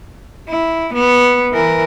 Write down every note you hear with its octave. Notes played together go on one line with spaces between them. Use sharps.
E4
B3
E3 A#4